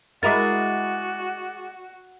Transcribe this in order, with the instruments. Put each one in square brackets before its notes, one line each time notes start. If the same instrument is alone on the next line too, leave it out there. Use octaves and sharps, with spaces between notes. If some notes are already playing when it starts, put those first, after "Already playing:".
[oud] G#3 E4 A#4 [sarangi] F#4 [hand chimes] D6 A6